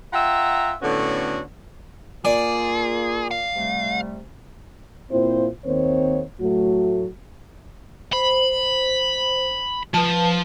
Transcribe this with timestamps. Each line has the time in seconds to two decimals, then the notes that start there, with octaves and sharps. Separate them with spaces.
0.13 F4 E5 F#5 G5 A#5
0.82 A2 D3 B3 C#4 F#4
2.25 A#3 F4 G#4 D5
3.31 F5
3.56 C3 G3 A3
5.11 A#2 C4 E4 F4 C5
5.65 D#2 D#3 A#3 C4 C5 C#5
6.39 A2 F#3 A3 F#4
8.13 C5 B5
9.94 F3 B4 A5